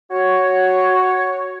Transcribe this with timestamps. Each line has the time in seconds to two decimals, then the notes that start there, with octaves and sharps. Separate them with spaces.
0.11 F#4 C#5